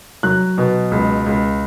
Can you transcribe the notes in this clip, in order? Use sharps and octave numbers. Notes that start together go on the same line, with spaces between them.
F#3 F#6
B2
C#2
C#2